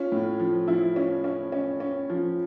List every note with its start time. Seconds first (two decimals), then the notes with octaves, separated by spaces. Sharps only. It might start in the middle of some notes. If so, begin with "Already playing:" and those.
Already playing: C#4 F4
0.12 A2
0.40 F3
0.68 F3 E4
0.96 C#4
1.24 C#4
1.52 C#4
1.80 C#4
2.10 F3